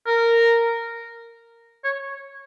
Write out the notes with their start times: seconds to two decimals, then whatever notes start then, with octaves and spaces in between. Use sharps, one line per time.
0.07 A#4
1.84 C#5